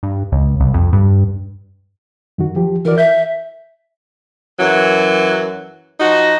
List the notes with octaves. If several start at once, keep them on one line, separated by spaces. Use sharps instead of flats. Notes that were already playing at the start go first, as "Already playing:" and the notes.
G2
C#2
C2
F2
G2
F#2 D#3 F#4
F3 G4
E3 F#4 A#4 D5
E5 G6
F#2 E3 F#3
F3 D#4 F#4